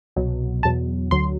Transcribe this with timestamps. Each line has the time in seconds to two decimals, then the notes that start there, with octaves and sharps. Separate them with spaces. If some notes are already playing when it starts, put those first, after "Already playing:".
0.16 C2 B2 F#3
0.63 E2 B2 F#3 A5
1.11 D2 D3 F#3 C6